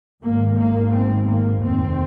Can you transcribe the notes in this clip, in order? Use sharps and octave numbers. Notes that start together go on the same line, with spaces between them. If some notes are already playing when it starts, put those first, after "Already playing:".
G#1 G#2 A#3
A#3
C4
A#3
F1 D#2 C4